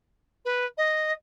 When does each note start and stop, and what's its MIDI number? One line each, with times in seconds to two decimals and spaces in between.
0.45 0.65 71
0.78 1.12 75